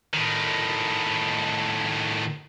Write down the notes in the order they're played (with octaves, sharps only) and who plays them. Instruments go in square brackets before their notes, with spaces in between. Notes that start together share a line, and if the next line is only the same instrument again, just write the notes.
[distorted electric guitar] A2 D#3